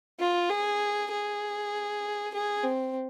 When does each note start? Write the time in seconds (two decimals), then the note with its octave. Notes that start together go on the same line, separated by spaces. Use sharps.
0.20 F4
0.50 G#4
1.11 G#4
2.33 G#4
2.63 C4